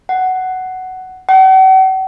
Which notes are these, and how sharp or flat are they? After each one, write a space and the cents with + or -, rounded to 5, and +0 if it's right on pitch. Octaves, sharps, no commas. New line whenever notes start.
F#5 +10
F#5 +45